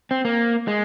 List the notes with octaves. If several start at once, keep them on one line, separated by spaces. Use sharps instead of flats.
C4
A#3
G#3